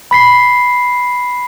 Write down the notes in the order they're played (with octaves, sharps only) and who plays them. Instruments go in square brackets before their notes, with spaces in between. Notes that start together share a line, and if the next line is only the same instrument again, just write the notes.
[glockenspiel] B5 B6 C7